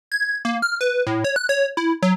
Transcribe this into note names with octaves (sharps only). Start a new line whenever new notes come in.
G#6
A#3
F6
B4
A2
C#5
F#6
C#5
E4
F#3